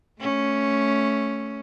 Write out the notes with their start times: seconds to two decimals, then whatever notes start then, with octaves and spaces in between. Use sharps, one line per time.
0.21 A3 C#4